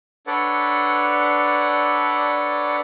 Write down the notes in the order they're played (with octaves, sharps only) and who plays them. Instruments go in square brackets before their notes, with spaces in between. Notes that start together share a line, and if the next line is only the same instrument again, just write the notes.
[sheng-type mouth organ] D4 A4 B4 C#5 D5 F#5